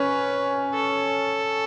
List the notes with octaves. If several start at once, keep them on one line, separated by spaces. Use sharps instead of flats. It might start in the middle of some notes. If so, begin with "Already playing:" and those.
Already playing: C#4 B4
A4